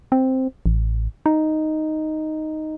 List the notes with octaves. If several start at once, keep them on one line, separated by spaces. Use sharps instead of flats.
C4
A1
D#4